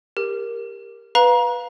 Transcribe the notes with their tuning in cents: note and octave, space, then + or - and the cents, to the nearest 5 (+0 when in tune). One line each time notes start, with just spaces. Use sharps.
G4 +20 A#4 +0
B4 +0 F5 +15 A#5 +35